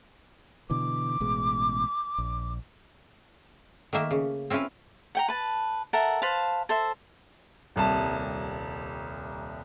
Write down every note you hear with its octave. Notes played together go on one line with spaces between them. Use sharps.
B2 D3 E3 D6
A1 B2 G#3
A#1
D#3 A3 A#3 E5
C#3
C4 C#4 E4 F4 B4
F#5 G5 A#5
B4 A5
A4 A#4 E5 F#5
B4 C5 F5 A5
A4 C5 E5
D#1 C2 A5